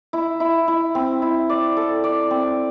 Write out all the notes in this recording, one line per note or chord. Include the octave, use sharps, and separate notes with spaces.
E4
E4
E4
C4
E4
D5
A4
D5
C4